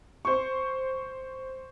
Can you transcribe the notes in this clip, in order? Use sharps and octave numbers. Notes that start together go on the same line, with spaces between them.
C5 C#6